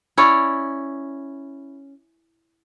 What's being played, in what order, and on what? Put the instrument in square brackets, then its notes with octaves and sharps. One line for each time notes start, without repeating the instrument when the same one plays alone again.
[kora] C#4 E4 C#5 D5